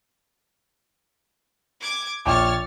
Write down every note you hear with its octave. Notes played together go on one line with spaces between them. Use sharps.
D6 G#6
A#1 C#5 G5 D6 F6 A6